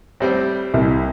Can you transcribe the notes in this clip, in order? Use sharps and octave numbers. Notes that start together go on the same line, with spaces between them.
A2 G3 C4
C2